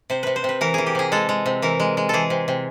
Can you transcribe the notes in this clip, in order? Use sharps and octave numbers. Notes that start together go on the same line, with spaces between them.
C3 C5
C3 B4
C5
C3 B4
E3 A#4
E3 G#4
G4
C3 G#4
G#3 A4
G#3
C3
E3 A#4
G#3
G#3
E3 G#4 A4
C3
C3